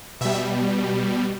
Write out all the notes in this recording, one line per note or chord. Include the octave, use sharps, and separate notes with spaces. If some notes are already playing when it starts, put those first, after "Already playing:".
B2 G3 E5